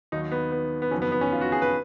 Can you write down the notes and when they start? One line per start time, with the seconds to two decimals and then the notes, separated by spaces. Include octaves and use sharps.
0.12 D#2 D#3 F#3 D#4
0.32 B3
0.52 B3
0.82 B3
0.91 F#1 F2 D#3 F#3 C#4
1.02 B3
1.12 B3
1.21 C#4
1.32 F4
1.41 F#4
1.52 G#4
1.62 B4